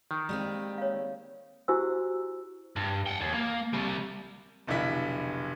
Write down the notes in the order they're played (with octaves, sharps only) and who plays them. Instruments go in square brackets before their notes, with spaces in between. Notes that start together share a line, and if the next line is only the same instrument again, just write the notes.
[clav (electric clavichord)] D#3
[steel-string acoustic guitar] G3 A#3 C4 [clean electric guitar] G#3
[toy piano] C#5 F5
E4 F#4 G4 C5 G#5 E6
[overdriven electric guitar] G2
F#5 G5
D#2
A#3
C3 G3
[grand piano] F1 B1 D3 E4 B6